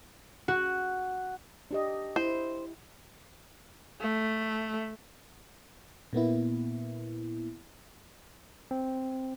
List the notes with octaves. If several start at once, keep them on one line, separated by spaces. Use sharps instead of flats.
F#4
D4 G4 D#5
E4 C5
A3
A#2 A#3 B3 E4
C4